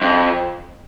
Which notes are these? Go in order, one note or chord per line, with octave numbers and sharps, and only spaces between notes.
F2